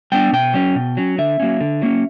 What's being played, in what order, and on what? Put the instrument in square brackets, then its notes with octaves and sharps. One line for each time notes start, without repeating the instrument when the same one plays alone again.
[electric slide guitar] G3 B3 D4 G5
B2 G5
F#3 C#4
B2
F#3 C#4
D3 E5
F#3 A#3 C#4
D3
F#3 A#3 C#4